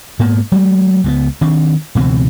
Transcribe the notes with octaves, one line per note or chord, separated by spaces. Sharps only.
G#2 A#3 B3
F#3 G#3 A3
C#2 G3 B3
D#3 C4 D4
C#2 B2 E3 C4